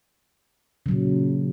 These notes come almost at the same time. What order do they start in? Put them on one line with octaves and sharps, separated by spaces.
C#3 F#3 A#2